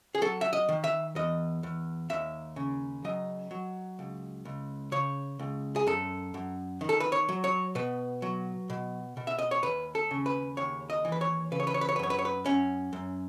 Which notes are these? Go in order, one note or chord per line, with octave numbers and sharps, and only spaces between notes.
G#4
F#3 A4
E5
D#5
D#3
E5
E2 D#5
E2
D#2 E5
C#3
F#3 D#5
F#3
C#2
C#2
C#3 C#5
C#2
G#4
F#2 A4
F#2
D#3
A4
B4
C#5
F#3
C#5
B2 B4
F#3
B2
B2
E5
D#5
C#5
D#2 B4
A4
C#3
B4
D#2 C#5
D#5
E3
B4
C#5
C#3 B4
C#5
B4
C#5
B4
C#5
B4
F#2 C#5
B4
C#5
B4
F#2 C#4
F#2